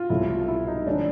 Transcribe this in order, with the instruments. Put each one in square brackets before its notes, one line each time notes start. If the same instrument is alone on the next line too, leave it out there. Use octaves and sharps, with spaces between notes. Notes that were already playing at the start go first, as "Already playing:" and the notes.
Already playing: [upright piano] F4 F#4
[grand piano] C2 B2 F#3 A3 [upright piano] E4
[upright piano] F4
E4
D#4
[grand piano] D3 F3 A3 C#4 [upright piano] D4